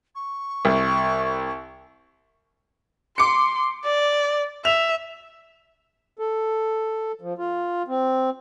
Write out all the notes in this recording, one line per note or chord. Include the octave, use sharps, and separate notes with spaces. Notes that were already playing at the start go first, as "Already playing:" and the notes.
C#6
C2
C6 D6 C#7
D5
E5 F7
A4
F3
F4
C4